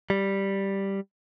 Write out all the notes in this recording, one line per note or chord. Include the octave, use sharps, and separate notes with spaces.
G3